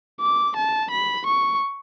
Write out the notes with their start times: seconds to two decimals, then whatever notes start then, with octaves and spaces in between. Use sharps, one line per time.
0.21 D6
0.56 A5
0.91 B5
1.26 C#6